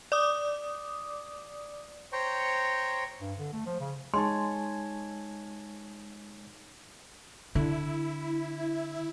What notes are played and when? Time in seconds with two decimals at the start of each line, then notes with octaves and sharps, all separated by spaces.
0.12 D5 D6 D#6
2.12 C5 C#5 G5 A#5 C#6
3.21 G2
3.39 D3
3.53 A3
3.66 F3
3.80 C#3
4.14 G#3 D#4 C#5 G#5 A5 C6
7.55 D3 E4